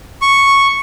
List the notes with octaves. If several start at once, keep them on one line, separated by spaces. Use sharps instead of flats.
C#6